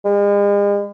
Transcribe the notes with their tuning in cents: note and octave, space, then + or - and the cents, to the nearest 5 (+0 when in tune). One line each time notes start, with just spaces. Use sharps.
G#3 -45